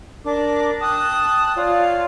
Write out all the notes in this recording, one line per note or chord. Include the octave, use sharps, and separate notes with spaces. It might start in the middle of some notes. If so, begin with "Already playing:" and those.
D4 A#4 D6
G5 A5 D#6 F#6
F4 C#5 D5 F5